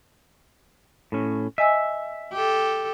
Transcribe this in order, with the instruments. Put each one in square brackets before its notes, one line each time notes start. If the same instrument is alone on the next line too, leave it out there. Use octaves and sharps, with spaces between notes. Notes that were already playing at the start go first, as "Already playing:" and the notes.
[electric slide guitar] A2 C#4
[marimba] D#5 G#5 E6 [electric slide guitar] E5
[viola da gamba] G4 A4